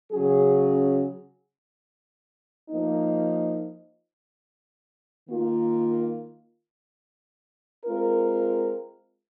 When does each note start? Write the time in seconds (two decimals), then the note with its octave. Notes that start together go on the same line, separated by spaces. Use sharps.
0.11 C#3 F#3 C#4 G#4
2.69 F3 A#3 D#4
5.26 D#3 A#3 F4
7.84 G#3 C4 F4 A#4